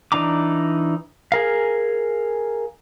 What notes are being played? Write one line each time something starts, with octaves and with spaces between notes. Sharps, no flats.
E3 D4 D#4 A#5 D6
G#4 A#4 F5